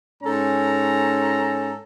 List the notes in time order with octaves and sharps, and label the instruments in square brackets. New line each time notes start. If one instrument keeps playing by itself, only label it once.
[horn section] G#2 C#4 A4 A#5